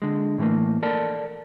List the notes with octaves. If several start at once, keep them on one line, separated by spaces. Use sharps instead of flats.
D3 G#3
A2 E3 G3 A3 A#3
A4 A#4 D5 A5